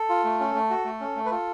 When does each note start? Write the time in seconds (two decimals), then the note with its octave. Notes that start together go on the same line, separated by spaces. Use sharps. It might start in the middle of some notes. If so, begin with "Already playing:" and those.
Already playing: A4
0.09 F4
0.24 A3
0.40 C#4
0.55 A3
0.70 F#4
0.85 A3
1.00 C#4
1.16 A3
1.26 B4
1.31 F4 A4